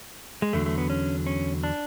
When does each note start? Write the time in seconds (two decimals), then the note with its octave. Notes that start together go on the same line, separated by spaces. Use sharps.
0.42 G#3
0.53 E2 D3 F#3 A3
0.66 A3
0.78 B3
0.90 C#4
1.26 C#4
1.63 D4